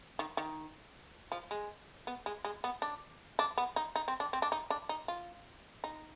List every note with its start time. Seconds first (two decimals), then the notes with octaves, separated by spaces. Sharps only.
0.19 D#3
0.37 D#3
1.32 F3
1.51 G#3
2.07 B3
2.26 G#3
2.45 G#3
2.64 B3
2.82 D4
3.39 D4
3.58 B3
3.76 D#4
3.96 D#4
4.08 C4
4.20 D4
4.33 C4
4.42 D4
4.52 D#4
4.70 D4
4.89 D#4
5.08 F4
5.84 D#4